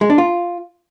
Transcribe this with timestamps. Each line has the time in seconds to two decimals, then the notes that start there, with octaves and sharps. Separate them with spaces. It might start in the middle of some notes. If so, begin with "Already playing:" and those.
0.01 G#3
0.10 D4
0.18 F4